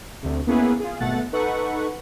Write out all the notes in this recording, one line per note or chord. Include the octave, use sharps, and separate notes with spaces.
D2 C3
A#3 B3 C#4 E4 G#4 B4
F4 G#4
G#1 B2 A3 F#5 A6
D#4 A4 B4 F#5 C#6